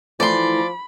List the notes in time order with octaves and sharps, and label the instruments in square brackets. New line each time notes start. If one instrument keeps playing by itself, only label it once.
[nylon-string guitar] E3 A3 [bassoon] F3 [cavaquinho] D5 C6 [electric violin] B5